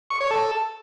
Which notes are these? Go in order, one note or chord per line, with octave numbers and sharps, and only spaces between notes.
C#6
C#5
A4